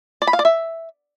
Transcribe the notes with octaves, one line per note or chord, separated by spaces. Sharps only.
D5
B5
F5
D5
E5